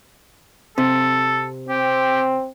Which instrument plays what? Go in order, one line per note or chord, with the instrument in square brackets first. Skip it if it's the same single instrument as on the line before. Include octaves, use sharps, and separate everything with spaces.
[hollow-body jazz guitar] C3 [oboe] A4
[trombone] C4 [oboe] G4